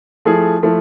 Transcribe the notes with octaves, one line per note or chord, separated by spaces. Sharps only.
F3 A3 E4 G#4
F3 A3 E4